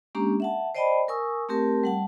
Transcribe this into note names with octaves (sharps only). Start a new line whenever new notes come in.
G#3 A#3 C#4 D4 G4 A#5
E5 F#5 A5
C5 D5 D#5 G5 A5 B5
A#4 G#5 C#6 D#6 E6
A3 C4 G4 A#4 A5
G3 F#5 A5